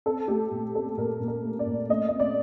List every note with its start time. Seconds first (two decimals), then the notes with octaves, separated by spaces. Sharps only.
0.06 C4 A4
0.28 A3 G4
0.51 A#2
0.74 C4 A4
0.98 A#2 A#4
1.20 A#2
1.28 A#4
1.43 A3
1.59 D5
1.67 A#2
1.89 A3 D#5
2.08 C4 D#5
2.20 D5